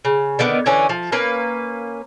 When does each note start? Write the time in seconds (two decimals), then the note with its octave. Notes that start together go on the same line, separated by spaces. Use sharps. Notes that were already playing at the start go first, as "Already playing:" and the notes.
0.05 C#3
0.39 D3 D#3 B3
0.66 D3 E3 C#4 G#5
0.89 F3
1.12 A#3 C#4 B4